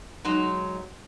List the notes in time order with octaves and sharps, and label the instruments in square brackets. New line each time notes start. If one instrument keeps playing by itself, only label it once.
[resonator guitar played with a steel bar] F#3 G#3 D#4